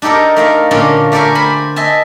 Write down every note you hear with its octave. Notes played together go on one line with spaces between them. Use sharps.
D4 D#4 G4 A4 A#4
A3 A#4 F5
A#2 D3 C#4 D4 F4
A3 G4 A4 A#4 D5 G#5
C5 G#5 B5
D#5 E5 G#5 A5